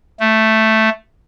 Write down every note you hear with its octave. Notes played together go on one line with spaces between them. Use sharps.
A3